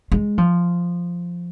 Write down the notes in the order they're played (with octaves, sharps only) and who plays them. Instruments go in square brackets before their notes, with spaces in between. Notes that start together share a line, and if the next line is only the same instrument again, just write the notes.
[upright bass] G#3
F3